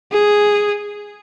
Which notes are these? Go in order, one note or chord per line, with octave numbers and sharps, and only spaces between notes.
G#4